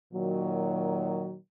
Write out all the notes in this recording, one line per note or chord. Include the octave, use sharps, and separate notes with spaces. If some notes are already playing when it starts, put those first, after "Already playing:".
A#2 D#3 F#3